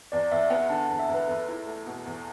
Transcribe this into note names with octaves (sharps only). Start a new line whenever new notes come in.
E2 D5
E2 E5
B3 F#5
D3 A5
E2 F#5
E5
E2
B4
E2 A4
E4
A3
B2
E2